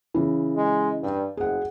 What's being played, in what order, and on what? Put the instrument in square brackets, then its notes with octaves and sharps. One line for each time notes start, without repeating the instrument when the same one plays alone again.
[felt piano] C#3 E3
[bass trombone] G#3
G2
[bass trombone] F#1 [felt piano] G#4 F#5